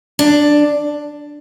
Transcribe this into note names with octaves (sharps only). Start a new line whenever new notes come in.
D4